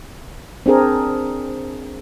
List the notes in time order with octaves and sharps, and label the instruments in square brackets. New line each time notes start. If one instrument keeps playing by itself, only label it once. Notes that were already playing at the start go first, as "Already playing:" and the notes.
[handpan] C4 D4 G#4 A#4